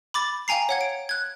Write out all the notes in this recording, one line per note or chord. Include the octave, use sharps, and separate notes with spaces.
B5 D6 A6
F5 G5 G#5 A#5 C7
C#5 F#5 G#6
D7
F#6 G#6